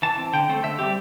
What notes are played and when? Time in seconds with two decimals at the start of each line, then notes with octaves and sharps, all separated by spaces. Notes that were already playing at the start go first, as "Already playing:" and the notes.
0.02 E3 A5
0.18 C4
0.33 D3 G5
0.49 A3 C4
0.63 D3 E5
0.79 G3 C4 G4